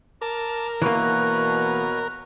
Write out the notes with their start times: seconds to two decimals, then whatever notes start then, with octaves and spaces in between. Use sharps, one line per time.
0.22 A#4 A5 D6
0.82 B2 E3 A#3 B4 C#5